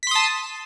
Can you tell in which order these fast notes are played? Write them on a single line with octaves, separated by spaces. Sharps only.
B6 C6 D#6 A5